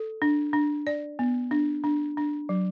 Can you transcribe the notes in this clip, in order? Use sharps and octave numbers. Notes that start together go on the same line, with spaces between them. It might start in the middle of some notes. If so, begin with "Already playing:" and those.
Already playing: A4
D4
D4
D5
B3
D4
D4
D4
F#3